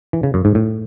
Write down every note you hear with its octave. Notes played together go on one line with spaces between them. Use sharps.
E3
C#3
F#2
G#2
A2